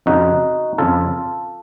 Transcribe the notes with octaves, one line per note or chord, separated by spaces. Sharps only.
F2 C#3 D#4 F#4
F2 C#3 F4 A4